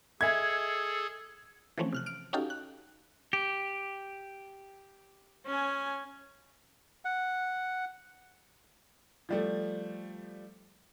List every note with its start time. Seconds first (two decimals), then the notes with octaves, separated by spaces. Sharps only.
0.21 G#4 A4 D#5 E5 G#5 G#6
1.78 E3 F3 A3 C4 C#4
1.93 C3 F6 F#6
2.06 F6 D7
2.33 C#4 D#4 F#4 G4 A4 F5
2.50 F#6
3.33 G4
5.46 C#4 G#5
7.05 F#5
9.29 F3 G3 A3